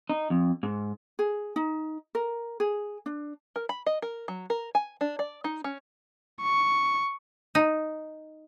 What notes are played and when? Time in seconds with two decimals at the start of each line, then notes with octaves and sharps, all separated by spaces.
0.10 D#4
0.30 F2
0.63 G#2
1.19 G#4
1.56 D#4
2.15 A#4
2.60 G#4
3.06 D4
3.56 A#4
3.69 B5
3.86 D#5
4.02 A#4
4.28 F#3
4.50 A#4
4.75 G#5
5.01 D4
5.19 D5
5.44 D#4
5.64 C#4
6.43 C#6
7.55 D#4